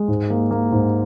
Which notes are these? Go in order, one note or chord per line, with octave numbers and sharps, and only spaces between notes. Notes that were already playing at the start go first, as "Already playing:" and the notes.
Already playing: G#3
G#2
A#3
A#3
G#2